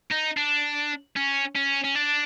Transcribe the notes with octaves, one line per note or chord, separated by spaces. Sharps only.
D#4
D4
C#4
C#4
C#4
D4